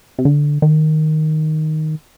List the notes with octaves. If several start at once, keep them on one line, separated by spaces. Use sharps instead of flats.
C3
D3
D#3